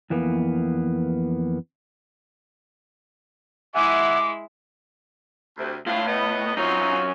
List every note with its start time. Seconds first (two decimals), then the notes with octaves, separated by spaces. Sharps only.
0.10 F2 E3 A#3 B3
3.75 G#3 E4 E5 F#5 G#5 D6
5.58 D2 C3
5.86 A2 D4 E4 F4
6.06 B3 D#5
6.57 F#2 C4 D#4 F4 C#5